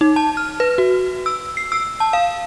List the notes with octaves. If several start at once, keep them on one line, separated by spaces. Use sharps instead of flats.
D#4
A5
F6
B4
F#4
E6
C7
E6
A5
F5